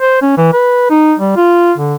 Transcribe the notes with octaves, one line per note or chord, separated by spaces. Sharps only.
C5
C#4
E3
B4
D#4
G3
F4
D3